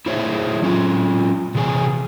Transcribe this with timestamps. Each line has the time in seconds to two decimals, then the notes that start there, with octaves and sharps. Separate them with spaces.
0.06 E4 G#4 C5 C#5 E5
0.62 F#3 C#4 F4
1.55 C3 E3 G#4 B4 G#5